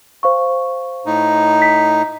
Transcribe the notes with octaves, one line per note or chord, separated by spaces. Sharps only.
C5 F5 C#6
A2 D#4
B6